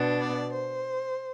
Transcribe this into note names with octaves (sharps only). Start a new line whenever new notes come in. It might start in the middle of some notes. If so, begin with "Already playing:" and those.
Already playing: B2 B3 D4
D5
C5